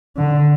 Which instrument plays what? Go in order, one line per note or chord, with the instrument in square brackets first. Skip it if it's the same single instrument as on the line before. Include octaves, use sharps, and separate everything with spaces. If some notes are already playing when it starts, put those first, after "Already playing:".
[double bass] D3